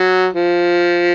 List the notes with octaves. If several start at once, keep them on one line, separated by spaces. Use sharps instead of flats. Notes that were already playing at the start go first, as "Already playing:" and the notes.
Already playing: F#3
F3